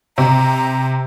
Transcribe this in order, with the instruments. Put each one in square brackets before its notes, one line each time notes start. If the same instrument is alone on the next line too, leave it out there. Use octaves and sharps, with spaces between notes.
[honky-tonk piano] C3 [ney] A#5